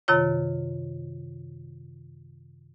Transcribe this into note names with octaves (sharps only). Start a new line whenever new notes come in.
F#2 C3 D#3 F4 C#5